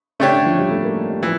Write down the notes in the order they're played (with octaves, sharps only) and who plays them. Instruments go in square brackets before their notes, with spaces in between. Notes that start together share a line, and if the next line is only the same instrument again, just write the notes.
[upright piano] C#3 [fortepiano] A3 D4 G4 C#5
[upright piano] D3
F3
G3
A3
A#3
G3
[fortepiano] E3 [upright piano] F3